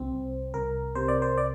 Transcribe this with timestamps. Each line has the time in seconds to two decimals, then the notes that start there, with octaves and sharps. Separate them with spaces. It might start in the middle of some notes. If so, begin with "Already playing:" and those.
Already playing: C2 C4
0.12 C2
0.54 C2 A#4
0.95 C3 C5
1.08 D5
1.22 C5
1.38 D5